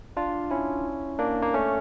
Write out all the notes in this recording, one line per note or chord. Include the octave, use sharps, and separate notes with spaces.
D4 F4
C#4 E4
A#3 D4
A#3
A3 C#4